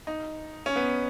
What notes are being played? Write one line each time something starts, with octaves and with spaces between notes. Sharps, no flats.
D#4
C#4
B3